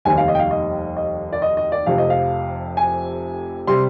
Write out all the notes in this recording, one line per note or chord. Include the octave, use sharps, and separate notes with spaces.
F1 D#2 D#3 G3 G#5
F5
D#5
G5
F5
D#5
D#5
D5
D#5
D#5
D5
F1 F2 C3 F5
D#5
F5
G#5
C3 G3 C6